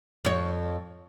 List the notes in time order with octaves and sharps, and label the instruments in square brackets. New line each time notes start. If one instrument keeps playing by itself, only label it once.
[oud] F2 C#5